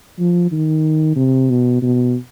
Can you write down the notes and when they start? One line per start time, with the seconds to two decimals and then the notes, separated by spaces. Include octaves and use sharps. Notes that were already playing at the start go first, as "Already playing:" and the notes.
0.19 F3
0.51 D#3
1.16 C3
1.50 B2
1.82 B2